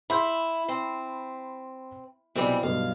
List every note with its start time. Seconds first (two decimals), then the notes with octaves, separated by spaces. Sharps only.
0.10 E4 B5 C6 G6
0.68 C4
2.36 B1 C3 E3 G3
2.63 B1 G2 F5